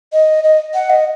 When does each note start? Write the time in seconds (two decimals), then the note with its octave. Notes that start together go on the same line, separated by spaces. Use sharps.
0.13 D#5
0.44 D#5
0.74 F#5
0.90 D#5